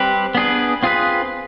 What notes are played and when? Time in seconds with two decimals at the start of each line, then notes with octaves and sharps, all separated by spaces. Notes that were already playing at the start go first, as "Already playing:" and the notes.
Already playing: G3 C4 G4 B4
0.35 B3 D4 G#4 B4
0.83 C4 F4 G#4 B4